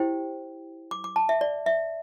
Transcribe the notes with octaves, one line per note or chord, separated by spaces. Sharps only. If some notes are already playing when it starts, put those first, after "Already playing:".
Already playing: E4 G4 C5 G5
D6
D6
A5
E5
D5
E5